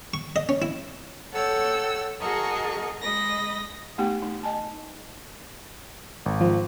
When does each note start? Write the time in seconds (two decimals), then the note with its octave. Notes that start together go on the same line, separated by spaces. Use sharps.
0.14 C#6
0.36 D#5
0.49 C#4
0.62 E4
1.33 A4 C#5 F#5 G5 E6
2.20 F#4 G#4 A#4 D#5 A5 C#6
3.01 G#3 D#5 B5 A#6
3.98 A3 B3 D#4 G4 G5
4.22 A3 D#4
4.43 D#5 G#5 A5
6.26 G#1
6.41 F3